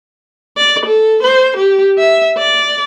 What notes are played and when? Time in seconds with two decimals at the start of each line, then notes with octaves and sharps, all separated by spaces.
0.57 D5
0.86 A4
1.23 C5
1.57 G4
1.99 E5
2.38 D5